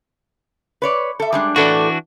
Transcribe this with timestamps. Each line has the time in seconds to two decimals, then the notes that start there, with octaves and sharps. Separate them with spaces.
0.82 B4 C#5 D5
1.20 A4 E5
1.32 G3 G#3 D4
1.56 A2 E3 D4 F#4 A4 D5